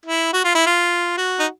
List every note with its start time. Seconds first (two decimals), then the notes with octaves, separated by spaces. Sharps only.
0.06 E4
0.33 F#4
0.45 F4
0.55 E4
0.66 F4
1.17 F#4
1.39 D#4